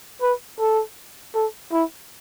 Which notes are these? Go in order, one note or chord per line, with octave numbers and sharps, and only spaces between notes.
B4
A4
A4
E4